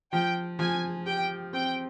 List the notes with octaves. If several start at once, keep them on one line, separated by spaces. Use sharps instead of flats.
F3 G5
F3 G#5
G4 G5
C4 G5